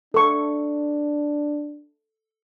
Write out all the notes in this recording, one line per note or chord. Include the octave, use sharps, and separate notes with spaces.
D4 A4 C#6